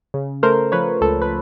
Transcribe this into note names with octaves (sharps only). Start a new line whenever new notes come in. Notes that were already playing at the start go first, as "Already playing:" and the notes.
C#3
A3 A#4 C5
F3 B4 C#5
C#2 A4
B4